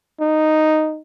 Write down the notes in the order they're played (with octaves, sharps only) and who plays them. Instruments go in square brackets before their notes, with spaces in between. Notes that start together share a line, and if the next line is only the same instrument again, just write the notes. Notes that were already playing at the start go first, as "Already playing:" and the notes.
[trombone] D#4